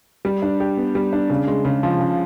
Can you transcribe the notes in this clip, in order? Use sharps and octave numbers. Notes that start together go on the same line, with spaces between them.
G3
D4
G4
B3
G3
D4
C#3
G#3
C#3
F3
C#3